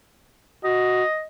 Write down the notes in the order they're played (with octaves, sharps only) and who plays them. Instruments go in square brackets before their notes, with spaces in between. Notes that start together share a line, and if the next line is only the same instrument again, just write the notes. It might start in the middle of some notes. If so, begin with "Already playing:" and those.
[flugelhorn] F#4 [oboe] D#5